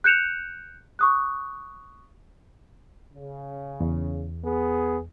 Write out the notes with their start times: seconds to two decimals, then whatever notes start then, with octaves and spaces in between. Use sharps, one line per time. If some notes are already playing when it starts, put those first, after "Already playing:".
0.04 F#6 G6 C#7 E7 F7
0.99 C#6 D#6 F#6
3.14 C#3
3.80 E2
4.44 B3 G#4